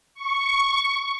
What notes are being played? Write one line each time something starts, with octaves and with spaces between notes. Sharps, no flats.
C#6